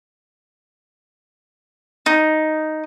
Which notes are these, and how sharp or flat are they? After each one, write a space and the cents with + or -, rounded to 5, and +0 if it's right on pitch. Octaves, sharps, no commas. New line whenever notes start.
D#4 +0